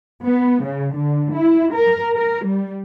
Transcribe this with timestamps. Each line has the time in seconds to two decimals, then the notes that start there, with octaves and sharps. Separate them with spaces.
0.25 B3
0.64 C#3
0.96 D3
1.34 E4
1.73 A#4
2.16 A#4
2.45 G3